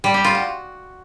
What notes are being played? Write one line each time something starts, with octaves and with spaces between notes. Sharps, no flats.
G3
G4
F4
F#4